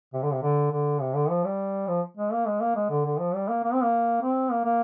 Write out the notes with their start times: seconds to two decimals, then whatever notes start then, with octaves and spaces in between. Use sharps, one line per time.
0.13 C3
0.22 D3
0.33 C3
0.42 D3
0.71 D3
1.01 C3
1.15 D3
1.30 F3
1.45 G3
1.88 F3
2.17 G#3
2.33 A#3
2.46 G#3
2.61 A#3
2.76 G#3
2.90 D3
3.05 D3
3.19 F3
3.34 G3
3.49 A#3
3.64 A#3
3.73 C4
3.83 A#3
4.22 C4
4.51 A#3
4.65 A#3